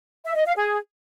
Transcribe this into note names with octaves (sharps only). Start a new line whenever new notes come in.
E5
D#5
F5
G#4